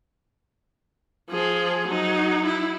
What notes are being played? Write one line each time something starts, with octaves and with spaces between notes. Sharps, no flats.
F3 G#4
F#3 D#4
E4